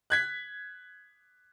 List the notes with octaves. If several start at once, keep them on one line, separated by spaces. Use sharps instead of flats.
F#6 G#6 B6